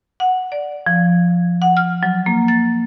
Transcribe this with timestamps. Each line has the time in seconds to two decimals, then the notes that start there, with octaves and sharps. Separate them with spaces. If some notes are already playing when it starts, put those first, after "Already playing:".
0.20 F#5
0.52 D5
0.86 F3
1.62 F#5
1.77 F6
2.03 F#3
2.26 A#3
2.48 A6